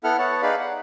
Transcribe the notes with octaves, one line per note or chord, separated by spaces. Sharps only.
B3 E4 A4 F#5 F6
B3 C#5 F#5 A5
D#4 G#4 B4 D5 F5 B5
F#5